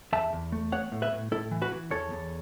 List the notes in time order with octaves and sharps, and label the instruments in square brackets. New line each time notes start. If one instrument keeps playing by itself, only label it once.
[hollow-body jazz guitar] E2 E5 A5
E2
A3
B3 C#5 F#5
A2
B4 E5
A2
A2 E4 A4
E3
F#4 B4
E3
E2 A4 C#5
E2